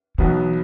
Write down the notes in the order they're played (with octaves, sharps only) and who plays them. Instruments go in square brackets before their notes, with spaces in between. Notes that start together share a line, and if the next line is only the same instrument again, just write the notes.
[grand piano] B1 B2 F#3 B3 [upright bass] E3